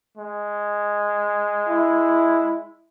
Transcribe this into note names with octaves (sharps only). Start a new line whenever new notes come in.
G#3
E4